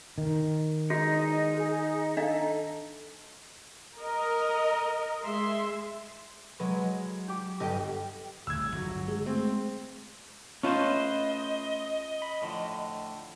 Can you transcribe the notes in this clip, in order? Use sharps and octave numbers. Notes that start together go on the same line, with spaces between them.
D#3
E2 G#3 D#4 F#4
G#4
D4 A4 D#5 F5
A#4 D#5
G#3 E5 C6
F#3 G#3 B4
G4 D6
G1 G4 D#5
D1 A1 D2 G3 E6 G#6
G1 D3 F#3
G#3 G#4
A3 C4
A3 C#4 F4 B4 C5 D#5
B5
A2 D3 F3